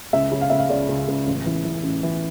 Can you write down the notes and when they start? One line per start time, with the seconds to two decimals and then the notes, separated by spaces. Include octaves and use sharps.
0.13 C#2 E5
0.32 C#3
0.41 F5
0.50 C#2 E5
0.59 F5
0.70 C#2 D5
0.89 C#2
1.08 C#2
1.27 A1
1.46 E3
1.64 E3
1.83 A1
2.03 E3